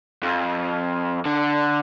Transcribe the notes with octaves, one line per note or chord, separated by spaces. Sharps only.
F2
D3